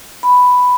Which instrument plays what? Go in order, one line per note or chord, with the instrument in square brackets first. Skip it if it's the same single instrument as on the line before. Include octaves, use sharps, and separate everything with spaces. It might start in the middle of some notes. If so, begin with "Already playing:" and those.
[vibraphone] B5